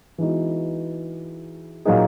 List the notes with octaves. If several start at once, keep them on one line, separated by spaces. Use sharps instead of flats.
E3 G#3 B3 D#4 F#4
A#2 F#3 A#3 D#4 G#4